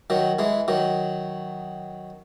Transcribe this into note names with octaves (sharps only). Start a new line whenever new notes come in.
D#3 F#3
E3 G#3
D#3 F#3